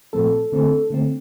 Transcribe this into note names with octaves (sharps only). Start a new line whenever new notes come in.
A#2 F3 A3 C4 A4
D3 A3 C4
D3 A3 C4